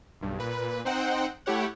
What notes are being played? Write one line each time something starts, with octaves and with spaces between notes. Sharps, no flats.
B1 G2
A#2 B4
C4 D#4 C5 F#5 G5
A3 E4 G4 C#5 F#5